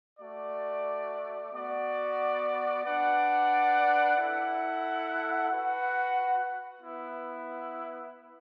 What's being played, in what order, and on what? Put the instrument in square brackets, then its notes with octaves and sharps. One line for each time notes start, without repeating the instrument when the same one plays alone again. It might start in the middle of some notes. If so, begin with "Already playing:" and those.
[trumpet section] A3 F#4 D5
B3 F#4 D5
D4 B4 D5 F#5
E4 A4 F#5
F#4 B4 F#5
B3 E4 B4